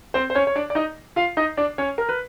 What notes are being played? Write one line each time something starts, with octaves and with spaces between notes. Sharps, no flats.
C4 C5
C5
C#4 C#5
C#5
D4 D5
D5
D#4 D#5
F4 F5
D#4 D#5
D4 D5
C#4 C#5
A#4
B4